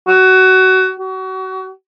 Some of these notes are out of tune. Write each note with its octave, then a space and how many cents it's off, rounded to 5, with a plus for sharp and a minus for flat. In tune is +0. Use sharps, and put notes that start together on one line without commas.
F#4 +20
F#4 +30